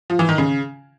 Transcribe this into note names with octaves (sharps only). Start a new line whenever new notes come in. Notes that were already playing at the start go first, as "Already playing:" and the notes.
F3
E3
D#3
C#3